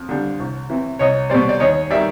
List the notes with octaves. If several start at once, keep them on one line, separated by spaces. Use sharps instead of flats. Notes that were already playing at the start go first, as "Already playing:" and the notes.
Already playing: F2
D3 G3
C2
C3 E3
C2 C#5 D#5
B2 G3 C5 D5
D5
D#2 C#5 D#5
D#3 G3 D5 E5